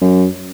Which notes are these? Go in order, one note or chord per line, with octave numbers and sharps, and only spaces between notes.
F#2